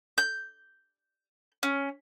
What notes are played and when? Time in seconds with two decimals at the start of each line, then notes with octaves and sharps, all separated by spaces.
0.18 G6
1.63 C#4